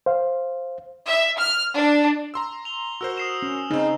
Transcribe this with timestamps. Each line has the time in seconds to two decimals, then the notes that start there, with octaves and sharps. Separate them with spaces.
0.06 C5 F5
1.07 E5
1.38 F6
1.77 D4
2.34 A#5 C6 E6
2.65 F7 G7
3.01 F#4 A#4 C5 E6
3.18 D#6 C7 E7
3.42 C#4
3.70 C#3 C4 D#4